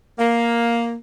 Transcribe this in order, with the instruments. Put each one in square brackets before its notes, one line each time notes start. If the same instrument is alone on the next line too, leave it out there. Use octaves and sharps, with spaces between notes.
[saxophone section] A#3